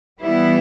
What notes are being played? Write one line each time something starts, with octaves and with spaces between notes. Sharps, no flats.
E3 G3 B3 E4